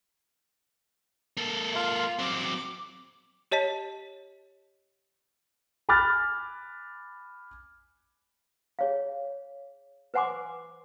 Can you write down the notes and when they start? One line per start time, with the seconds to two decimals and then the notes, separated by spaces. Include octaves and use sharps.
1.37 A#3 A4
1.74 F4
2.19 F#3 C4 D6
3.52 G4 C#5 D#5 A5 B6
5.89 G#5 B5 D6 F6 F#6 A6
8.79 G#4 C#5 F5
10.14 B4 C5 F#5 G#5 C6 D6